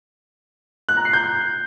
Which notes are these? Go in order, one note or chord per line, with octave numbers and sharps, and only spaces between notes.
F#6
A#5
C7
G6